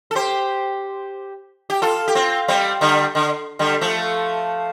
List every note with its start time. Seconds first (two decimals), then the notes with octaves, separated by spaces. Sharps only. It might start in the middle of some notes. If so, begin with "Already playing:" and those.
0.11 A4
0.15 G4 C5
1.70 G4
1.82 F4 A4
2.08 G4
2.15 C4 F4
2.48 G3 C4
2.81 D3 G3
3.15 D3
3.59 D3 G3
3.81 F3 A3